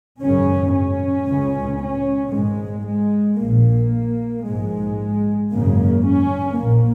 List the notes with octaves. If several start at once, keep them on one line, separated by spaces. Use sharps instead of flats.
G#1 F#2 C#3 C#4
C#4
C#2 C#3
C#4
G#1 G#2 G#3
G#3
A#1 A#2 A#3
A#1 G#2 G#3
G#1 F#2 C#3 A#3
C#4
A#1 A#2 A#3